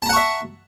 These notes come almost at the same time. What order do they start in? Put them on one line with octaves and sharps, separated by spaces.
A5 A#5 F#5 C#6 E5